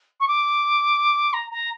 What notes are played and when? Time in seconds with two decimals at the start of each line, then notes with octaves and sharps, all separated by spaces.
0.20 C#6
0.28 D6
1.33 A#5
1.51 A#5